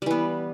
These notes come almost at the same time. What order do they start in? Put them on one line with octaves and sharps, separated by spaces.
G3 E3 B3